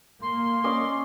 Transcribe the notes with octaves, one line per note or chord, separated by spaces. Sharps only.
A#3 C6
C#4 D5 D#5